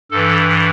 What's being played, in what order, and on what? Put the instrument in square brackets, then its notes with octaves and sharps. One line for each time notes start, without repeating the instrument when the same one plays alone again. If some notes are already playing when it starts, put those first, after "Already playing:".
[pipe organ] G2 E3 A4